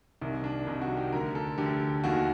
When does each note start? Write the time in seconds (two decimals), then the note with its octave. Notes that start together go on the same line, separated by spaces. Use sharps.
0.21 C2 C3 D#3
0.44 D4
0.67 C2 C3 D#3 D#4
0.81 F#4
0.97 G4
1.12 D2 D3 A#4
1.35 A4
1.58 D2 D3 G4
2.04 D#2 D#3 F#4